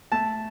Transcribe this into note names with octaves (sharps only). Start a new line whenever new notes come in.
A3 A5